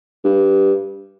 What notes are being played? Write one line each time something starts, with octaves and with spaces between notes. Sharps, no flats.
G2